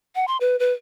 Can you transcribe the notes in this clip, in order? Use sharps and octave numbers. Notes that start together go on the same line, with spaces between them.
F#5
C6
B4
B4